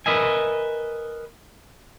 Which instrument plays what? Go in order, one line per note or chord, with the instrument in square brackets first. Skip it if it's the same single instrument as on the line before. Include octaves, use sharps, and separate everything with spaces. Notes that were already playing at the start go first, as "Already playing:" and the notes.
[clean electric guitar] A#4 B4 D#5 E5 G#5